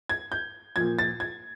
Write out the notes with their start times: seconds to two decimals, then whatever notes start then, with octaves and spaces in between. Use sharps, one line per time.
0.09 G#6
0.32 G6
0.76 A#2 F3 G#6
0.99 A6
1.20 G#6